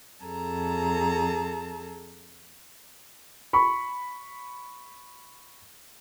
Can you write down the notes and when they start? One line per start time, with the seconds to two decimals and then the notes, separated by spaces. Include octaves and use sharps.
0.22 F2 G#4 A4 A5 A#5
3.53 B5 C#6